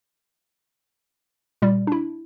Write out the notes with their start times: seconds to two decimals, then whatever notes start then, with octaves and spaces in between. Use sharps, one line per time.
1.62 A#2 G3 D5
1.87 D4 E4